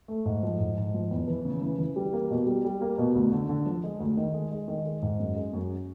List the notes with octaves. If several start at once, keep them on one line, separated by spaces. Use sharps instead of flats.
A3
G#2
F3
G#2
G#2
F3
E2
E3
C#3
E3
E3
G3
A#3
B2
G3
G3
A#3
B2
D2
D3
D3
F3
G#3
D2
D#3
G#3
G#3
D#3
G#3
G#2
F#2
G#3
F#2